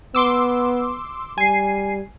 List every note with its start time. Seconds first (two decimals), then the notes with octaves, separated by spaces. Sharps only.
0.15 B3 C6 D6 E6
1.38 G3 G#5 C7